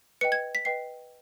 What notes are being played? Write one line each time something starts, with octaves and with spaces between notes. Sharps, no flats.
B4 D#5 G5 C#7
G#6
B6
B4 D#5 G5 C7